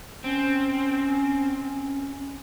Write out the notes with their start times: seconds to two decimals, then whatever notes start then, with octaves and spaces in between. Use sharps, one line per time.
0.24 C4 C#4